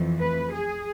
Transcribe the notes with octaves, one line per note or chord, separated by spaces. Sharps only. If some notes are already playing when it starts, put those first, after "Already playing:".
Already playing: F2 E3 A3
B4
G#4